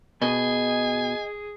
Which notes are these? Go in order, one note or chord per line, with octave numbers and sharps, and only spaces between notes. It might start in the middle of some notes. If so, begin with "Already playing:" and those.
B2 G#4 D#5 G#5